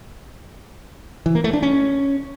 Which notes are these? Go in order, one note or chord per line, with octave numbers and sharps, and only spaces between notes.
E3
A#3
A3
D4
C#4